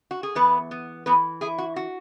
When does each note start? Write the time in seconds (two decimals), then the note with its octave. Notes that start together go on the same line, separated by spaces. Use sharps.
0.11 F#4
0.23 G#4
0.35 E2 B3 B4
0.71 B3
1.06 E3 B3 B4
1.41 E4 G#4
1.58 F#4
1.76 F#4